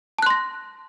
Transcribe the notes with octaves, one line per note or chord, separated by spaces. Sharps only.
A5 C6 F#6 A#6